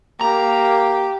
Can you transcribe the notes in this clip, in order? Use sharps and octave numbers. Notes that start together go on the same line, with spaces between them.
A#3 G4 A#5